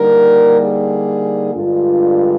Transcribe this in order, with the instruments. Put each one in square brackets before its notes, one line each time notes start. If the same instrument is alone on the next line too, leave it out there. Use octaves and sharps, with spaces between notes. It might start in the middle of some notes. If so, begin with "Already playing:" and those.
Already playing: [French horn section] D3 G3 A#3 D#4 A#4
G#4
G2 D3 G#3 F4